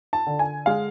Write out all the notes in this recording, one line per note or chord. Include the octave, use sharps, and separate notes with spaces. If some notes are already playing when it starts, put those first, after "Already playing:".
A5
D3
G#5
G#3 F5